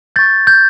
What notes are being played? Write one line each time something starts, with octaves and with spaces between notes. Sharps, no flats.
C#6 G6 A6
G6